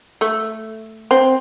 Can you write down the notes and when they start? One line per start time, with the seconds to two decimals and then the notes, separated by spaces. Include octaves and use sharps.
0.21 A3
1.11 C4